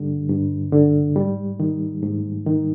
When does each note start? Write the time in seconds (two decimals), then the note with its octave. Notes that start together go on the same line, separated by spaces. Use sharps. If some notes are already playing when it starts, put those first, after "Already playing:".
Already playing: G2 D3 G3
0.30 G2
0.72 D3
1.16 G#2 G3
1.60 D#3
2.03 G#2
2.46 D#3